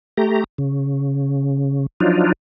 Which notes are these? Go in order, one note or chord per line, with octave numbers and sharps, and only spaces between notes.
A3 G4 A#5
C#3
F3 F#3 D4 D#4 F4